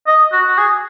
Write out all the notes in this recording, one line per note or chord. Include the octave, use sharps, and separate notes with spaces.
D#5
F#4
F#4
G#4